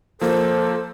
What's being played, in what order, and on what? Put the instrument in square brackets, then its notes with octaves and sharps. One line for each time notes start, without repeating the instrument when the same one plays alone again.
[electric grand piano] F3 A#3 [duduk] A4 [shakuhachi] C5